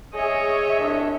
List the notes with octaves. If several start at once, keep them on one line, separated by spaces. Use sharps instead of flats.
G#4 C#5 D#5 E5
C2 D4